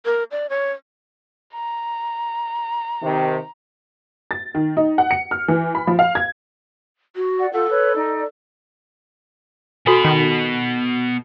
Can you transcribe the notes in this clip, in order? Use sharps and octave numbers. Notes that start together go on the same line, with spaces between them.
A#4
D5
C#5
A#5
C3 D#3
A6
D#3
D#4
F#5
C#7
F6
E3
B5
F3
F5
G#6
F#4
D5 F#5
F4 A4 F#5
B4 C#5
D#4 D5
B2 F#4 A4 G#5 B5
D#3